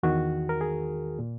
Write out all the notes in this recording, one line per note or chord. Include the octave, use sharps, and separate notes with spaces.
E2 D#3 F#4
A#4
G#4
A#2